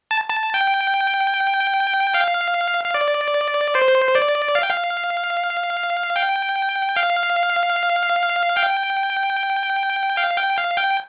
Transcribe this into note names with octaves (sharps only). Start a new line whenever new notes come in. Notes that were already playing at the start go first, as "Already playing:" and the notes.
A5
A5
G5
F5
F5
D5
C5
D5
F5
G5
F5
G5
F5
G5
F5
G5
F5
G5